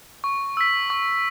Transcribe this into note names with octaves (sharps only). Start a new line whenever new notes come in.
C#6
E6 B6
C#6